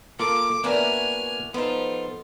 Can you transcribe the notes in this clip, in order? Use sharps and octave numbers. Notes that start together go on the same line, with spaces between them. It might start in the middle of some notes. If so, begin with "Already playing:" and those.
A#3 F4 A4 D6
A#3 B3 D4 E4 F#4 A#4 G#5 F6
F3 B3 D#4 F4 A4